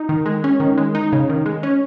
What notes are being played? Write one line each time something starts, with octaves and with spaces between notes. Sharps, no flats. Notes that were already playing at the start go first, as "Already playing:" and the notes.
Already playing: D#4
D#3
G#3
C#4
D#3
G#3
D#4
C#3
D#3
G#3
C#4